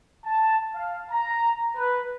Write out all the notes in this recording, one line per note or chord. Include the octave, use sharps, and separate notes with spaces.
A5
F5
A#5
B4